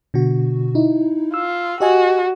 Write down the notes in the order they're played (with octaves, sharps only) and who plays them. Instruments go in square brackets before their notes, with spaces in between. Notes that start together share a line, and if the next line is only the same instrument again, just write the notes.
[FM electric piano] B2 D3 F#4
D#4 E4
[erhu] F4 [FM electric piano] E6
[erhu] F#4 [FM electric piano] G4 D#5 G#5